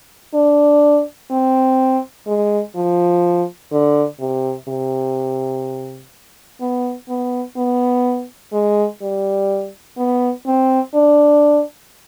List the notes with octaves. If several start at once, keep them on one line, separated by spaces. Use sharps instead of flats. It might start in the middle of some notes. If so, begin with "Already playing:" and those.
D4
C4
G#3
F3
D3
C3
C3
B3
B3
B3
G#3
G3
B3
C4
D4